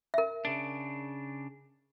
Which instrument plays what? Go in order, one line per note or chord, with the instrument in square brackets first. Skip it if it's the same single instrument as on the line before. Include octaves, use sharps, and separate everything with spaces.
[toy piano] A#4 E5
[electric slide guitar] C#3 D4